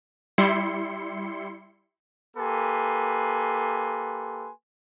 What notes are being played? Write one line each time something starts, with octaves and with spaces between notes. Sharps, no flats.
G3 E4 C6 C#7
A#3 G4 A4 B4 G#5 C6